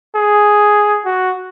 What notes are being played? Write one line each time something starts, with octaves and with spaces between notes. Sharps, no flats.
G#4
F#4